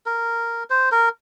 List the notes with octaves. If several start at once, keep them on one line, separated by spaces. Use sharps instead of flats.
A#4
C5
A#4